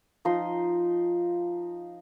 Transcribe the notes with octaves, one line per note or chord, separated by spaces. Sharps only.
F3 D#4 D#5 C6